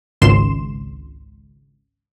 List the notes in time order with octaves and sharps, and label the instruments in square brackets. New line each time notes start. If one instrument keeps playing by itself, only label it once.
[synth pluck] G#1 C#2 C6 E7